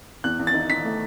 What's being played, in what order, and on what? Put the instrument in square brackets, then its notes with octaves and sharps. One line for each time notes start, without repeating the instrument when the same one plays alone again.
[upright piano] E2 F#6
E2
A6
D#4
D#4 B6
A3